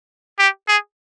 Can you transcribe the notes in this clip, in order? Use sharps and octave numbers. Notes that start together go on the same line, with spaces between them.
G4
G#4